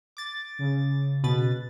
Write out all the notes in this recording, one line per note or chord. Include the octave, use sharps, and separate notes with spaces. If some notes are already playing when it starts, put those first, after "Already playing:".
D6 A6
C#3
B2 B4 A6